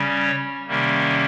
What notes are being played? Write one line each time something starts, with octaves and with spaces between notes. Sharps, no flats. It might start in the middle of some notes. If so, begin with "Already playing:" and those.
Already playing: C#3 G3 C#4
C#5
C3 D#3 G3 A#3 C#4